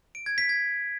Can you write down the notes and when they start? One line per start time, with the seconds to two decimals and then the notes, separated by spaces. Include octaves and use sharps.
0.15 D7
0.26 G#6
0.38 B6
0.49 G#6